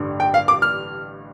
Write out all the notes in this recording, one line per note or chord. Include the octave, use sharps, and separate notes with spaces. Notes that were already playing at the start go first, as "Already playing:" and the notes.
Already playing: A1 G2 D3 G3
G5
F5
D6
F6